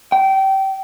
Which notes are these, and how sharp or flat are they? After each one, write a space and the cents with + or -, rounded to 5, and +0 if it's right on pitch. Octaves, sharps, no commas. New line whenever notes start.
G5 -25